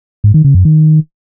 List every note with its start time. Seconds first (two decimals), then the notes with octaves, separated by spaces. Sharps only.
0.24 G#2
0.34 D#3
0.44 C#3
0.55 F#2
0.65 D#3